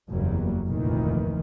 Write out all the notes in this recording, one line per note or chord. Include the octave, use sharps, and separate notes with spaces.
F#1 E2 F#3 G3 A#3
F1 D2 A#2 D#3 E3